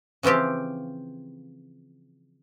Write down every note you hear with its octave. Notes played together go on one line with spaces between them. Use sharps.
C#3 E3 F3 C4 G4